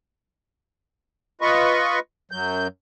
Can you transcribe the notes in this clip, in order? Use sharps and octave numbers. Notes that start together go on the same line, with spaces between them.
F4 B4 D#5 B5 C#6
F#2 F#3 G6